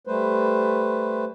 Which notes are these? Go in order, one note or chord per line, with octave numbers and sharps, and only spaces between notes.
G3 A3 B4 C5